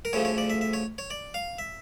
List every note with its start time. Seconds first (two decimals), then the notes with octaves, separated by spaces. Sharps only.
0.05 A#4
0.13 D2 C#3 F3 A3 C#5
0.25 C#5
0.38 D5
0.50 E5
0.61 E5
0.73 C#5
0.98 C#5
1.10 D5
1.34 F5
1.59 E5